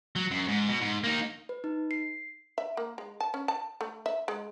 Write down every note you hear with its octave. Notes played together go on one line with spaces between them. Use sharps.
F#3
F#2
G#2
B2
G#2
A#3 D#4
B4
D#4
C7
E5
A#3
G#3
A5
C#4
A5
A3
E5
G#3